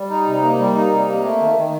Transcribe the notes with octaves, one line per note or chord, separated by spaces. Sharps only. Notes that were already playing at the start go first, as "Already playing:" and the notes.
Already playing: G3
D#4
C3
A#3
G3
D#4
C3
A#3
A3
D#3
D#3